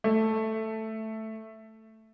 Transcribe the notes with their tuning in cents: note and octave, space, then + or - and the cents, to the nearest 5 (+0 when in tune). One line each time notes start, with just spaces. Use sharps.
A3 +0